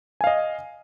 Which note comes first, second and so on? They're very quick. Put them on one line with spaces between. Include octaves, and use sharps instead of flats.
G#5 F5 D#5